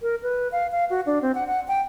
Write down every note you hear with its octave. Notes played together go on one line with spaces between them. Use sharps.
A#4
B4
F5
F5
F#4
D4
C4
F#5
F#5
G5